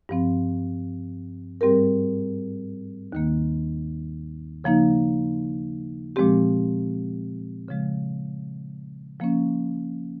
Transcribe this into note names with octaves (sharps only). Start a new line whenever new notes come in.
G2 F3 C4
G#2 G3 C4 G4 A#4
D#2 D#3 A#3
C#3 F3 A#3 D#4
A#2 F3 G#3 C4 G4
C#3 F3 G#3
F3 A#3 C#4